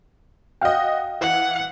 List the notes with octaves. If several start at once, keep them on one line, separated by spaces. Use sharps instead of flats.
F#4 D#5 F5 G5
E3 F#5